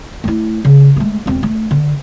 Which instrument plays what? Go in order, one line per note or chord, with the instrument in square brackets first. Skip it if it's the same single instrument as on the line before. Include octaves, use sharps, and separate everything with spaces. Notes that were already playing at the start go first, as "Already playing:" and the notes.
[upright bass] A3 E4
C#3
G#3 A3
E1 C4
A3
D3